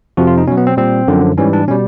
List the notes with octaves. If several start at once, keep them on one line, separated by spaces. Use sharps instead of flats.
F2 C3 F3 F#4
F4
D#4
B2 F#3 C#4
B3
C4
A#2 G3 C4
F#2 D3 F3
G#2 E3 G3 C#4
D4
B2 G3 C#4